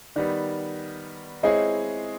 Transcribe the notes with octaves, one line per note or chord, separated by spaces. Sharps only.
D#3 G3 B3 D5
G#3 C4 E4 G#4 C#5 D#5